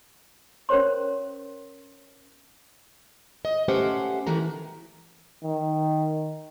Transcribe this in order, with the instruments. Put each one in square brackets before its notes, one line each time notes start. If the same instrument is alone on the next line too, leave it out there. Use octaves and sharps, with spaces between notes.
[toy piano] C#4 A#4 C5 C#5 C6
[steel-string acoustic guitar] D#5
A3 C#4 G4 B4 C5 F#5
D#3 E3 A3 F#4 A#5
[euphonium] D#3